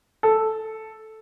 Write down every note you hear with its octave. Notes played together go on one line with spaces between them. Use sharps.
A4